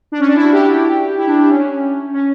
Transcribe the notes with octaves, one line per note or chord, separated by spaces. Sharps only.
D4
C#4
D4
E4
F#4
G4
E4
D4
D4
C#4
C#4